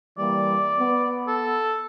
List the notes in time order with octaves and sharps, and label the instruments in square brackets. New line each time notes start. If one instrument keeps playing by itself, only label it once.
[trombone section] E3 G3 A#3 [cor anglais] D5
[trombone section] B3
[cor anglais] A4